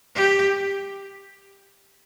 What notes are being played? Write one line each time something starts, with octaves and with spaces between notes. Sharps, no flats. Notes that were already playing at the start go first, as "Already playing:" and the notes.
G4